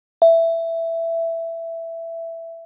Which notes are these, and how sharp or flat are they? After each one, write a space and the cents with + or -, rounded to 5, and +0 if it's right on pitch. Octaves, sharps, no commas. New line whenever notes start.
E5 +10